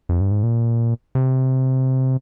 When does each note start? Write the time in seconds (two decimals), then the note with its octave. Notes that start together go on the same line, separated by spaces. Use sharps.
0.09 F2
0.21 G2
0.31 G#2
0.43 A#2
1.15 C3